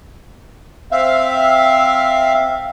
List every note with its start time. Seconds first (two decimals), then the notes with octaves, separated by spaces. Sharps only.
0.92 C4 E5 F5